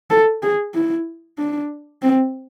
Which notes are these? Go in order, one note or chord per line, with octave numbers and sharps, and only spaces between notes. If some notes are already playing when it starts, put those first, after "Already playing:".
A4
G#4
E4
D4
C4